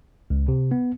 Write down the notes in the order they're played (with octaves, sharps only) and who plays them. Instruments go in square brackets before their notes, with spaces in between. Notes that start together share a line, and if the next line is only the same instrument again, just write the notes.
[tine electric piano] C#2
C3
B3